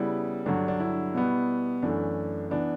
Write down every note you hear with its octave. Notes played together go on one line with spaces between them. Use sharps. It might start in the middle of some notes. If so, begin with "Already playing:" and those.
Already playing: C#3 G3 B3 E4
G2 D3 F#3 D4
D4
E4
B2 G3 B3
F#2 E3 A3 D4
E3 B3 D4